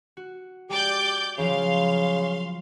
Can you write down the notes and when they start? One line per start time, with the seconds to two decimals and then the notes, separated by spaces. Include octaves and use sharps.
0.17 F#4
0.70 G#3 G4 D5 D6 G6
1.38 C#3 F3 F#3 F5 C6